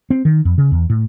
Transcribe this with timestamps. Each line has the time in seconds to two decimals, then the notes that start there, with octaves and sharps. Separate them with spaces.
0.10 C4
0.25 D#3
0.45 F2
0.58 C#3
0.72 E2
0.90 A2